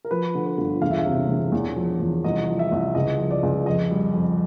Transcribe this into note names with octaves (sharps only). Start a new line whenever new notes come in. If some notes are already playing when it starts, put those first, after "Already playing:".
A#4
F3 B4
D3
B4
G1
E1 F5
E5
F5
C3
E1
E2
F3
E2
C2 D#5
F3
E5
C2
C#2 D#5
F3
D5
C#2
F2 D#5
G3
F2